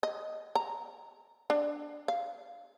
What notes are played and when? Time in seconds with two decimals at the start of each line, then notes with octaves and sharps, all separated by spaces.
0.03 D#5
0.55 A#5
1.50 D4
2.08 F5